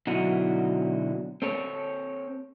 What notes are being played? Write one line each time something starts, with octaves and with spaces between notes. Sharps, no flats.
B2 D3 F#3 D#4 E4 F#4
C4 A4 C#5